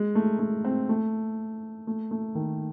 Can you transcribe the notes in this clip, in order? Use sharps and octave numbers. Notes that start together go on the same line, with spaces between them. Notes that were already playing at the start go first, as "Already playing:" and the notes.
Already playing: G#3
A3
A3
C4
A3
A3
A3
D#3